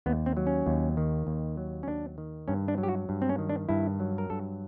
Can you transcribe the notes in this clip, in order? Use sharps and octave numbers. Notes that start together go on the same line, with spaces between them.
D#2 B3
C4
F#3
C#4
D#2
D#3
D#2
F#3
C#4
D#2 D4
D#3
G2 C#4
D4
F#3
G4
F#4
G2
C4
C#4
D#3
D4
G2 E4
F#3
A#4
G2 A4